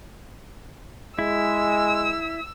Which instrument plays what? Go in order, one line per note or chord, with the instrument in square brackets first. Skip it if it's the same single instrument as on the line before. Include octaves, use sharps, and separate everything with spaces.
[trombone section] G#3 [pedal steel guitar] E4 [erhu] E6